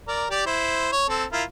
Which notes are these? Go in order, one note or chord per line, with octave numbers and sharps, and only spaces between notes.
A#4 D5
G4 D5
E4 C5
C#5
C4 A4
E4 F4 A#4